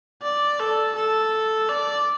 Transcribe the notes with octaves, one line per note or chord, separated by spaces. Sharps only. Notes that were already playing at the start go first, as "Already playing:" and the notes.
D5
A4
A4
D5